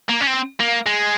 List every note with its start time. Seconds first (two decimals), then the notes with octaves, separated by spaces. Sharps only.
0.09 A#3
0.21 C#4
0.27 C4
0.60 A#3
0.86 G#3